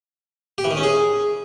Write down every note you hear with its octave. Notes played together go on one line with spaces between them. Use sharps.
G4
E3
D#3
C#4
G#4